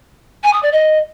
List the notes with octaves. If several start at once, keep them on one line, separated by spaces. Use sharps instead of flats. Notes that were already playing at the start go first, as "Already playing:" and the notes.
G#5
D#6
D5
D#5